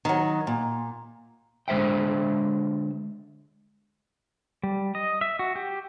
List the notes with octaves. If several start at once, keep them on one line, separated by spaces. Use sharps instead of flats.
D#3 F#3
A#2
D3 G#3 C5 E5 G5
G3
D#5
E5
F#4
G4